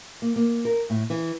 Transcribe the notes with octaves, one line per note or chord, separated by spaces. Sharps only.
A#3
A#3
A#4
A2
E3